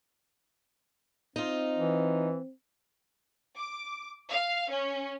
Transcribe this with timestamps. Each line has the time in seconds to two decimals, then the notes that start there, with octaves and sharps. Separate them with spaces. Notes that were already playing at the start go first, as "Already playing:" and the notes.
1.36 C4 D#4 F4
1.77 E3
3.57 D6
4.30 F5
4.70 C#4